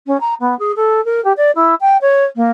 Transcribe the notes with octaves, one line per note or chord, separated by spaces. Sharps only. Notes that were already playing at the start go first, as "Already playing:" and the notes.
C#4
A#5
B3
G#4
A4
A#4
G4
D5
E4
G5
C#5
A#3